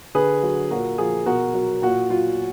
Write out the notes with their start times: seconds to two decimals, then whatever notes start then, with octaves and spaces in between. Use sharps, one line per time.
0.15 D3 G#4 B4
0.43 F#3
0.70 A#2 F#4 A#4
0.98 F3 F4 G#4
1.26 B2 F#4 A#4
1.54 F#3
1.82 A#2 F#4
2.10 F#3 F4